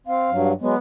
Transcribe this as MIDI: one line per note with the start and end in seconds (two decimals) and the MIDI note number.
0.07 0.30 60
0.07 0.50 77
0.31 0.53 43
0.31 0.53 54
0.61 0.75 54
0.61 0.75 56
0.61 0.78 59